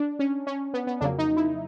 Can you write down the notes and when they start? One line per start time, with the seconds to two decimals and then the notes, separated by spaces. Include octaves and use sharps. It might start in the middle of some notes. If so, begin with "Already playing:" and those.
Already playing: D4
0.19 C#4
0.47 C#4
0.74 B3
0.87 B3
1.01 F2 C#3 F#3 A#3 D4
1.18 D#4
1.37 E4